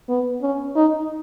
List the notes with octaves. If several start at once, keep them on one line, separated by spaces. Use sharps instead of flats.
B3
C#4
D#4